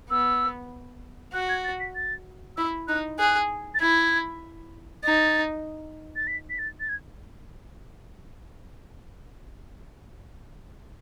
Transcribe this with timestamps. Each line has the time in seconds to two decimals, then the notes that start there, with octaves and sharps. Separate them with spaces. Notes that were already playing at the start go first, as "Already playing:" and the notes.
0.10 B3 E6
1.34 F#4 F#6
1.49 G#6
1.64 A6
1.80 B6
1.95 A6
2.57 E4 E6
2.88 D#4 F#6
3.19 G#4 F#6
3.75 A6
3.81 E4 G#6
5.03 D#4 A6
6.16 A6
6.27 B6
6.50 B6
6.59 A6
6.80 A6
6.89 G#6